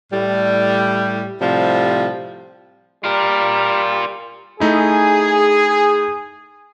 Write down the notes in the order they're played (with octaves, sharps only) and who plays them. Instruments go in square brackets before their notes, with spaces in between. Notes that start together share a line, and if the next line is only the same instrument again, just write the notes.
[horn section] A2 G3
A2 C3 F3 G3
[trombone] G3 [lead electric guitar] F4 A#4
[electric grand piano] A3 D#4 E4 [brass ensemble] G#4